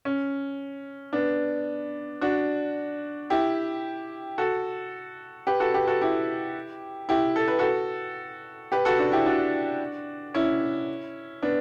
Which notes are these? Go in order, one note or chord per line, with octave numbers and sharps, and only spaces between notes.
C#4
B3 D4
D4 F#4
E4 G4
F#4 A4
G4 B4
F#4 A4
G4 B4
F#4 A4
E4 G4
E4 G4
A4
B4
F#4 A4
G4 B4
F#4 A4
D4 F#4
E4 G4
D4 F#4
C#4 E4
B3 D4